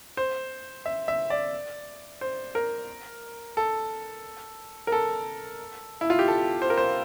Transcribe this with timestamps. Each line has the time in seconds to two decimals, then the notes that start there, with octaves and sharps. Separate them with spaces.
0.17 C5
0.86 E5
1.08 E5
1.30 D5
2.21 C5
2.55 A#4
3.57 A4
4.87 A#4
4.92 A4
6.01 E4
6.10 F4
6.19 G4
6.28 A4
6.62 C5
6.70 A#4
6.78 C5